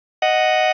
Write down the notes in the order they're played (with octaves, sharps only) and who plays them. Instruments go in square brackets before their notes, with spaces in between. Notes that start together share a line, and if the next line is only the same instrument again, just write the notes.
[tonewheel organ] D#5 F#5